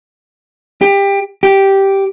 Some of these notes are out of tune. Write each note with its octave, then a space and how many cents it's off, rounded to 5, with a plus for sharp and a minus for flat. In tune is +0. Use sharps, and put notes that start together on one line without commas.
G4 +20
G4 -5